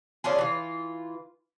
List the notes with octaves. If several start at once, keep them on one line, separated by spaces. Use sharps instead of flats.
C#4 D4 F4 G#4
E3 F4